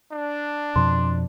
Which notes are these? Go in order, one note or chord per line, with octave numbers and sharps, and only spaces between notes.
D4
F2 B2 F3 C6